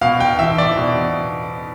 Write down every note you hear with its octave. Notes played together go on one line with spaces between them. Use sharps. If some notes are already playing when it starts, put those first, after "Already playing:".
B2 F5
G5
E2 E5
D5
B2